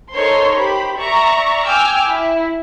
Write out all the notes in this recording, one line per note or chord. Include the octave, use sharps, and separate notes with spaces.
D#4 A4 A#4 C5 C#5 C6
G4 C5 B5
D5 E5 A#5 C#6
G5 G#5 D6 E6 F6
E4